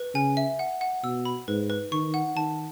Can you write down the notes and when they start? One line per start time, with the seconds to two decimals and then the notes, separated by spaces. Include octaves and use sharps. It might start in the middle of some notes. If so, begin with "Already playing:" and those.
Already playing: B4
0.14 C#3 G#5
0.37 E5
0.59 F#5
0.81 F#5
1.04 B2 E6
1.25 B5
1.48 G#2 B4
1.70 B4
1.92 D#3 C#6
2.14 F#5
2.36 D#3 A5